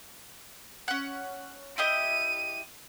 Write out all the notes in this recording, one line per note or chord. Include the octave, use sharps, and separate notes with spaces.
C#4 F#5
E4 G4 D#5 D#7